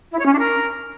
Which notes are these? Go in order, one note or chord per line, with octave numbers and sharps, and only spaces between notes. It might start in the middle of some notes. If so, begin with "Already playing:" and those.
E4
C#5
C#4
D4
A#4